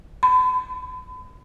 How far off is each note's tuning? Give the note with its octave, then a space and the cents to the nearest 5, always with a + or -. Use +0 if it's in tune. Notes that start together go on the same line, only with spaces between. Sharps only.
B5 +40